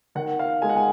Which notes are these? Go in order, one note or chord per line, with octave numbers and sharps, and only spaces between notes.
D#3 F#5
F5
G#3 G#5
F#5
G#5